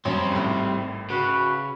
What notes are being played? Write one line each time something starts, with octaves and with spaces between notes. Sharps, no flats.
F#2 F3 G3 C4 C#5
G#1 A2
C#3 F#4 B4